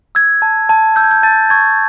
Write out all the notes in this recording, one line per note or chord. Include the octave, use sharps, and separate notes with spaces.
E6 G#6
A5
A5
E6 G6
G#6
G6
A5 A6
C#6 G#6